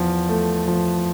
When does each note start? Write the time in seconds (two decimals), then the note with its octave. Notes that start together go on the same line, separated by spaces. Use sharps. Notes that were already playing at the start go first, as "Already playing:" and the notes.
Already playing: E2 F3
0.29 A3
0.68 F3